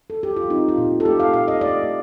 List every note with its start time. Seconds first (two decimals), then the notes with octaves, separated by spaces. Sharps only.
0.10 A4
0.23 G4
0.36 F4
0.50 C4 D#4
0.69 F4
0.78 A#2
1.00 A4
1.05 A3 G4
1.20 F5
1.34 A#2 F5
1.48 D#5
1.61 A3 D5